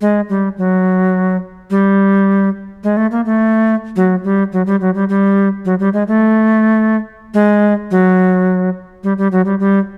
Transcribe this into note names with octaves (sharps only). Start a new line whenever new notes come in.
G#3
G3
F#3
G3
G#3
A3
A#3
A3
F#3
G3
F#3
G3
F#3
G3
G3
F#3
G3
G#3
A3
G#3
F#3
G3
G3
F#3
G3
G3